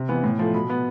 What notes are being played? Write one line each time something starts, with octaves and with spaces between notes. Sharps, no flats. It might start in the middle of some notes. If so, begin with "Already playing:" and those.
Already playing: C3
E3 B3
A2
F3 A3
B2 B5
B3